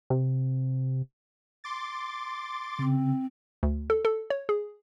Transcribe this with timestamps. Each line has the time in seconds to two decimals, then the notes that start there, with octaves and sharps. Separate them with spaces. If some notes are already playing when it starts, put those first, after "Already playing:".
0.10 C3
1.64 C6 D6 A6
2.79 C#3 C4
3.63 D2
3.90 A4
4.05 A4
4.30 C#5
4.49 G#4